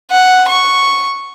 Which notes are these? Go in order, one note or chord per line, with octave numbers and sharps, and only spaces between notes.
F#5
C#6